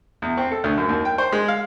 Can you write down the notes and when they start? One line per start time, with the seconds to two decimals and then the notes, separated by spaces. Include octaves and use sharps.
0.22 E2
0.37 C4
0.52 A4
0.64 D2
0.77 F#2
0.89 D#2
1.05 G5
1.18 C5
1.32 G#3
1.48 F5